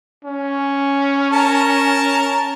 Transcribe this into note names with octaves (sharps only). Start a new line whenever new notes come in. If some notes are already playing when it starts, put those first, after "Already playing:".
C#4
A#4 A5